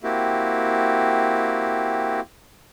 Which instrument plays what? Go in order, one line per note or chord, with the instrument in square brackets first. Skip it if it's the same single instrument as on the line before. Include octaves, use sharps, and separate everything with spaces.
[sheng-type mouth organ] A#3 C4 E4 F#4 G4